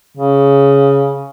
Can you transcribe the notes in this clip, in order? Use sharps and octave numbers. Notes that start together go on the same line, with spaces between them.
C#3